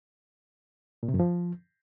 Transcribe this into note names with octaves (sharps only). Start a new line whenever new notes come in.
A#2
C3
F#2
F3